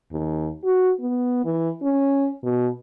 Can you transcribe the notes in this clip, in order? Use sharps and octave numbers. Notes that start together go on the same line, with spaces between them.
D#2
F#4
B3
E3
C#4
B2